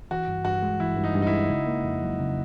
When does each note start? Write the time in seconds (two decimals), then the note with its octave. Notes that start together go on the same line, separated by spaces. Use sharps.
0.11 E3 F#4
0.27 G2
0.45 G2 F#4
0.62 G#3
0.80 E3 E4
0.97 G2
1.04 D#4
1.15 G2
1.22 D#4
1.27 E4
1.32 G#3
1.49 C#3
1.67 A#3
1.84 F2
2.02 F#3
2.20 C#3